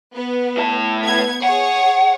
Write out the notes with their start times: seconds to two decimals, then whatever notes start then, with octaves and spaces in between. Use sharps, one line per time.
0.14 B3
0.57 A2 A5
1.02 B3 G#6
1.43 G#4 C#5 F#5